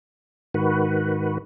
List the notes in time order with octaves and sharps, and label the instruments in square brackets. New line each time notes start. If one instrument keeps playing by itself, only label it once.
[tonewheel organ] G#2 D#3 F#4 B4